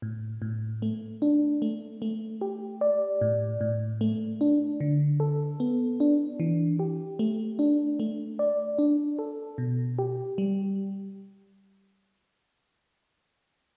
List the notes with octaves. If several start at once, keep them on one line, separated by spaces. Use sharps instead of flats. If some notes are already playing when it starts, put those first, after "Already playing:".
A2
A2
A3
D4
A3
A3
G4
D5
A2
A2
A3
D4
D3
A4
B3
D4
E3
G4
A3
D4
A3
D5
D4
A4
B2
G4
G3